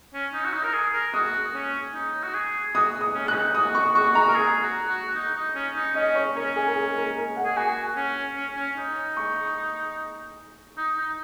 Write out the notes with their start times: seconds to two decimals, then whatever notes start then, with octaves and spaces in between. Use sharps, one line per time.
0.14 C#4
0.33 D#4
0.45 F#4
0.53 D#4
0.64 A#4
0.74 G#4
0.93 A#4
1.14 F#4 D#6
1.54 C#4
1.94 D#4
2.23 F#4
2.34 G#4
2.74 F#4 D#6
3.01 D#6
3.14 C#4
3.28 F#4 F#6
3.35 D#4
3.54 F#4 D#6
3.75 C#6
3.94 F#4 C#6
4.15 A#5
4.28 A#4
4.35 G#4
4.62 F#4
4.88 F#4
5.15 D#4
5.35 D#4
5.55 C#4
5.75 D#4
5.95 C#4 D#5
6.15 C#5
6.35 C#4 A#4
6.56 G#4
6.66 A#4
6.75 G#4
6.96 A#4
7.16 A#4
7.36 F#5
7.45 G#4
7.57 F#4 G#5
7.96 C#4
8.36 C#4
8.55 C#4
8.77 D#4
9.17 C#6
10.77 D#4
10.98 D#4